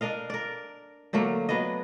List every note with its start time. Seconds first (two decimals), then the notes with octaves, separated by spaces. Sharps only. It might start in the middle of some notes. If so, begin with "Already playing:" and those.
0.01 D4 A#4 D#5 F5
0.30 A#4 D5
1.13 D3 F#3 A3 A#3
1.49 F#3 B3 D4 D#5